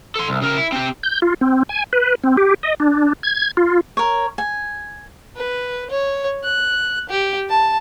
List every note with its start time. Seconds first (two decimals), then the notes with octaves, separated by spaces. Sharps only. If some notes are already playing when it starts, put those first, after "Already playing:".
0.16 A4 C6
0.29 C2
0.42 C#3 A#4
0.57 E4
0.72 C4 G4
1.03 G6
1.22 F4
1.41 C4
1.69 G#5
1.93 B4
2.24 C4
2.37 G4
2.63 D#5
2.80 D4
3.23 G#6
3.57 F4
3.97 A#4 C#5
4.38 G#5
5.36 B4
5.90 C#5
6.44 F#6
7.09 G4
7.49 A5